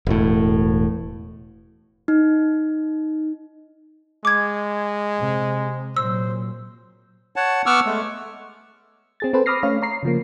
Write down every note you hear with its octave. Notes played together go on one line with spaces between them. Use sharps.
E1 A2
D#4
G#3 D6 G#6
C3
A#2 F#3 C5 E6
C#5 F#5 A5
B3 F#5 C#6 D6 E6 F6
G#3 A3
C4 G#4 A6
C4 A4 B4 C5
B5 D6 D#6 F6 A#6 C7
A3 C#4 C#5 F5
C#5 A#5 C7
C#3 F3 A#3